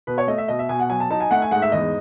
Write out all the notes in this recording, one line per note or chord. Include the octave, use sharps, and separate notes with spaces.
B2 B4
C#5
A3 D#5
E5
B2 D#5
E5
B2 G#5
F#5
F#3 G#5
A5
D#4 A5
G#5
A3 F#5
G#5
G#2 F#5
E5
E2 D#5